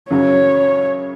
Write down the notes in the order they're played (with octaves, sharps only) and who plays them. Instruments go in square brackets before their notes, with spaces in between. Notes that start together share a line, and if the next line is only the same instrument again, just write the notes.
[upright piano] F#2 C#3 F#3 [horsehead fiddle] C#5